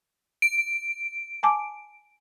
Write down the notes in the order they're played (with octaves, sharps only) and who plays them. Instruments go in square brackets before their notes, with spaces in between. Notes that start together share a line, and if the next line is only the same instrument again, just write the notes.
[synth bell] D7
[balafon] G#5 A5 D6